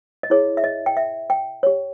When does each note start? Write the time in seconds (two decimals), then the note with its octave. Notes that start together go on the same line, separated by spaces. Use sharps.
0.23 D#5
0.30 E4 G#4 C#5
0.57 E5
0.64 D#5
0.86 G5
0.97 E5
1.30 G5
1.63 G4 C#5